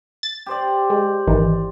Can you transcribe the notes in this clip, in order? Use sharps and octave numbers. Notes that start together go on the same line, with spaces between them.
A6
G4 C5 D5
G#3
G#1 D#3 E3